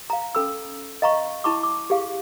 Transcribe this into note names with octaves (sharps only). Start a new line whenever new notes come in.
F5 A#5
C#4 A4 B5 E6
D#5 F5 A#5 B5 C#6
E4 A5 B5 C#6 D6
D6
G4 G#4 F5